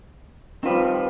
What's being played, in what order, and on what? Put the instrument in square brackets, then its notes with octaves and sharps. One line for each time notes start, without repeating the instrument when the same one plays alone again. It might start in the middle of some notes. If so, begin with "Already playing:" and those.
[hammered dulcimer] D#3 F3 G3 [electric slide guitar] C4 B4